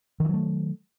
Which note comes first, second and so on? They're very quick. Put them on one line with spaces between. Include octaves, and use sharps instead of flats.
D#3 E3 F#3 A3